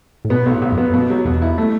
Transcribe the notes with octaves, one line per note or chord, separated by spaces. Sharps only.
A2
B2 B3
B1
A2
B1
F#2
B3
F#2 B2
F#3
E2 B2
E4
A3